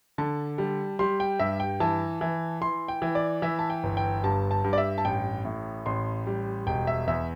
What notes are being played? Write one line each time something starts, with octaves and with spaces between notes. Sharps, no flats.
D3 A5
G3
G3 C6
G5
G2 E5
G5
E3 A5
E3
E3 C6
G5
E3
D5
E3 E5
A5
G5
G1
G5
G2 A5
A5
G2
D5
E5
A5
A1 G5
A2
A1 C6
G3
E1 G5
E5
E2 E5